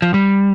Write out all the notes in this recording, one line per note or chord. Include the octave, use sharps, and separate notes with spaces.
F3
G3